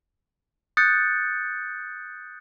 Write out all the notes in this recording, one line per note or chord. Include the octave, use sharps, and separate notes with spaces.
D#6 F#6 G6 A6 C#7